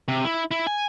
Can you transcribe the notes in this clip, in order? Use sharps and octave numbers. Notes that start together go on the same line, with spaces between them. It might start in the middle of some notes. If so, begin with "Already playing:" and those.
C3
E4
E4
G#5